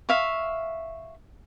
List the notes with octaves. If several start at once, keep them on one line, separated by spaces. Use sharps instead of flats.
E5 F5 C#6